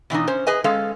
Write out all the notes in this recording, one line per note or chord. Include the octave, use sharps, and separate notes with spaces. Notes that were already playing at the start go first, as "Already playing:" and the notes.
B2 E3 D4 D#4
C#4 C5
G#4 B4 D#5 G#5
G#3 C#4 A4 F5